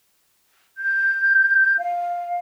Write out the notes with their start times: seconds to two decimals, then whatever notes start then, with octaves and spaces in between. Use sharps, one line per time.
0.78 G6
1.78 F5